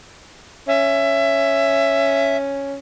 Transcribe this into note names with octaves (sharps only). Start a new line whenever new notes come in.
C#4 E5